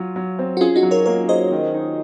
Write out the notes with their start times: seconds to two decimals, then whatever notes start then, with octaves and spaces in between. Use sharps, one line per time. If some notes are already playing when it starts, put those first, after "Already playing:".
Already playing: F#3 F4
0.16 F#3
0.39 C4
0.57 F#4
0.61 C#4 F4 G#4
0.76 D#4 F#4
0.83 F#3
0.91 A#4 C#5
1.06 A#3 A#4 C#5
1.28 G#4 C5 D#5
1.52 D#3
1.74 D#4